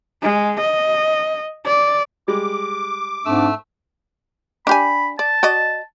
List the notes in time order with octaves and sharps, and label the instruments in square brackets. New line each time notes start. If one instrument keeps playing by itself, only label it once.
[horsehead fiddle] G#3
D#5
D5
[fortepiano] G3 G#3 [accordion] D6
[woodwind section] G#2 C4 D4 [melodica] A3 E6
[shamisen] D4 G4 G#5 [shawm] B5
[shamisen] D5 [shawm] A5
[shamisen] F#4 D5 D#5